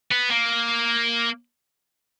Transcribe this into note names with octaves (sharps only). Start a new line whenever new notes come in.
B3
A#3